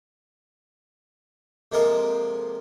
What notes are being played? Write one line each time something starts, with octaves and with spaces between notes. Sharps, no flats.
C3 F3 G#3 A#3 A4 A#4